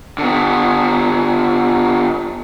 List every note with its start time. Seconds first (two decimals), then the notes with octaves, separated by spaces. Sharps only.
0.18 D3 B3